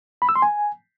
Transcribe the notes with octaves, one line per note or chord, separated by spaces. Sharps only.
B5
E6
C6
G#5